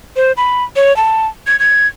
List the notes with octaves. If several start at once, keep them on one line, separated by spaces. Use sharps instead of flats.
C5
B5
C#5
A5
G#6
G#6